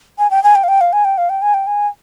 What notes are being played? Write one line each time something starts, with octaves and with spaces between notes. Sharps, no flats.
G#5
G5
G#5
G5
F5
G5
F5
G#5
G5
F5
G5
G#5
G5
G#5